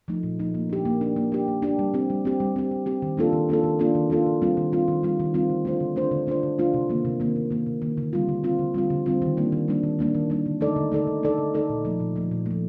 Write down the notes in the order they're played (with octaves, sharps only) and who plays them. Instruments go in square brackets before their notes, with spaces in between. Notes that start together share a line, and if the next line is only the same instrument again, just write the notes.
[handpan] F3 A3 D#4
A#2
F3 A3 D#4
A#3
D4 G4
A#3
D4 G4
A#3
D4 G4
A#3
D4 G4
G3
C4 G4
G3
C4 G4
G3
C4 G4
G3
C4 G4
D#3
A#3 D4 F4 A4
D#3
A#3 D4 F4 A4
D#3
A#3 D4 F4 A4
D#3
A#3 D4 F4 A4
D#3
G3 C4 F4
D#3
G3 C4 F4
D#3
G3 C4 F4
D#3
G3 C4 F4
D3
A3 D4 F4 C5
D3
A3 D4 F4 C5
D3
A3 D4 F4 C5
D3
A3 D4 F4 C5
C3
D#3 A#3
C3
D#3 A#3
C3
D#3 A#3
C3
D#3 A#3
D3
G3 C4 F4
D3
G3 C4 F4
D3
G3 C4 F4
D3
G3 C4 F4
D#3
G3 A#3 D4
D#3
G3 A#3 D4
D#3
G3 A#3 D4
D#3
G3 A#3 D4
D3
A3 D#4 A4 D5
D3
A3 D#4 A4 D5
D3
A3 D#4 A4 D5
D3
A3 D#4 A4 D5
A#2
F3 A3
A#2
F3 A3
A#2
F3 A3